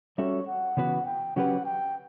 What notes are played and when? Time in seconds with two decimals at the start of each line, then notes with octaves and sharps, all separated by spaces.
0.18 G3 C#4 F#4 A4 C#5 E5
0.47 F#5
0.77 C#3 E3 B3 F#4 B4
1.06 G5
1.36 C#3 F#3 C#4 G4 B4 F#5
1.65 G5